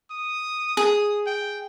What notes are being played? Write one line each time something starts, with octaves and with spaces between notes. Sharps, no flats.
D#6
G#4 D#6
G5